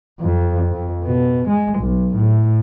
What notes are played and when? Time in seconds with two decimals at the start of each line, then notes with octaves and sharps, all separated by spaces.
0.20 F2
0.71 F2
1.04 B2
1.48 G#3
1.80 B1
2.15 A2